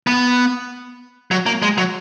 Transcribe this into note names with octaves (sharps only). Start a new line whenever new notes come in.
B3
F#3
A#3
G#3
F#3